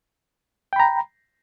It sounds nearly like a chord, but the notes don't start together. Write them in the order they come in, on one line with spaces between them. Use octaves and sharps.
G5 B5 A#5